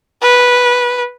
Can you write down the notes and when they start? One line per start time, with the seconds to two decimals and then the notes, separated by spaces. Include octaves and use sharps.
0.21 B4